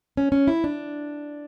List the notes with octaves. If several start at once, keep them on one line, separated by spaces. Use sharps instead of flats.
C#4
C#4
E4
D4